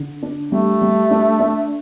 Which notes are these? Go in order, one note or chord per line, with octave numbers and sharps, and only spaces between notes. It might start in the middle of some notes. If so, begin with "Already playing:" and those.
Already playing: D3
D4
G3 A3
G3
D4
D4